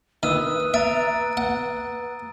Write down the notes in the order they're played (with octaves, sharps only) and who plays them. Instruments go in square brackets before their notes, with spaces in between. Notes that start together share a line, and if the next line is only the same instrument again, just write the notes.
[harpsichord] D#3 [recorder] B4 [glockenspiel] D#6 E6 D#7
[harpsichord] E5 [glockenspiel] A#5 A6 D7
[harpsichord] F#5